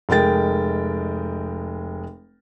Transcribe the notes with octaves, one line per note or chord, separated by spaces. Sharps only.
F1 G#3 A#4 G5 A6